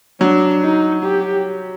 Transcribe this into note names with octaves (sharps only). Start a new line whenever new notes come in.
F#3 D4
D#4
G4